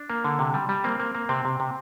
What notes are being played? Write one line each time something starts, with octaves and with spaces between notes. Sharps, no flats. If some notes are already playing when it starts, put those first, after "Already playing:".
Already playing: D4
A#3
D3
C3
G3
G3
A#3 C4
A#3
A#3
C3 C4
C3
C3